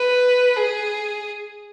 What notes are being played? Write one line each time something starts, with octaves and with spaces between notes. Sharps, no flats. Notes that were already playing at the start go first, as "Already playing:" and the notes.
Already playing: B4
G#4